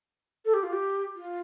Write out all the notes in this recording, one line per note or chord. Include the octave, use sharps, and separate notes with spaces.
A4
G4
F4
G4
F4